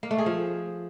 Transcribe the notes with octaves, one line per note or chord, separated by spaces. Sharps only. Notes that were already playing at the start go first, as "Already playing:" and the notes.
A#3
A3
G#4
F3